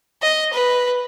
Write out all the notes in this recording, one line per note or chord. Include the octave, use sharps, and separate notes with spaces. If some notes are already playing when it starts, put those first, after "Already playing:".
D#5
B4